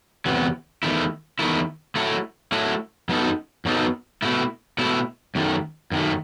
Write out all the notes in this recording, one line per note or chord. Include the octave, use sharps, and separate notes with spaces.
E2 C3 F#3 B3
E2 D#3 A3 E4
E2 D#3 A3 E4
F#3 A3 E4 A4
F#3 A3 E4 A4
F#2 F#3 B3 D#4 A4
F#2 F#3 B3 D#4 A4
B2 A3 E4
B2 A3 E4
F#2 D#3 A3
F#2 D#3 A3